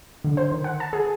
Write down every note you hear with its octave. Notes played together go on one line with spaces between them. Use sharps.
D3
C5
D#3
F#5
A5
G#4